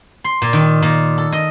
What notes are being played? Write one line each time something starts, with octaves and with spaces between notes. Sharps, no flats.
C6
A#2
D#3
A#2
A4
D#5